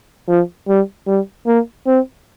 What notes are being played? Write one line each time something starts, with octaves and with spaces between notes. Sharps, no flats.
F3
G3
G3
A#3
C4